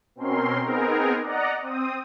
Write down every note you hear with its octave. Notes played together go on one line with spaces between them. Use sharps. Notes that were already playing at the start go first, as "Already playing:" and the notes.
B2 C4 C#4 A#4 C6
B3 C4 D#4 G#4 A#4
D5 D#5 F#5 A#5
C4 D#6